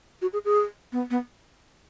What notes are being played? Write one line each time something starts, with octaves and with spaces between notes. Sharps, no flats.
F#4
G#4
G#4
B3
B3